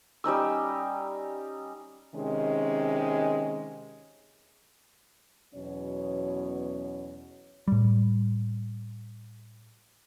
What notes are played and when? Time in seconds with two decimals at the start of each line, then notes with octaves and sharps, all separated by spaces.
0.24 G3 C#4 D#4 E6
2.15 C3 D#3 G#3 C#4
5.55 E2 B2 F#3 C#4 C#5
7.68 A2 G3